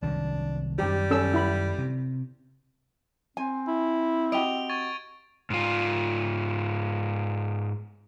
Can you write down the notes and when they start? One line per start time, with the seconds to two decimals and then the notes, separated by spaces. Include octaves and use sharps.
0.02 C2 D#3 F#3 D4
0.79 F#2 D#3 G3 G4
1.11 C#4 A4 E6
1.34 E4 B5
1.78 C3
3.37 C4 G#5
3.67 E4
4.32 F#4 G4 D#5 D7 F7 G7
4.69 C#6 G#6 A6
5.50 G#2 F4